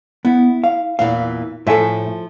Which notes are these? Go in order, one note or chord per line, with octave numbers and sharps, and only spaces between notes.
B3 E4
F5
E2 A#2 E3 F5
A2 F3 A4 E5 G#5